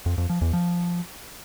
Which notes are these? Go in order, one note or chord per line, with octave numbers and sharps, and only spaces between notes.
F2
F2
F3
E2
F3